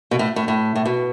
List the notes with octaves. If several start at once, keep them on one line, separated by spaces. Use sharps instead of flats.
B2
A2
A2
A2
A2
B2